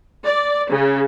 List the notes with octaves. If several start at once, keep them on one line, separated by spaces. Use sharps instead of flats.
D5
C#3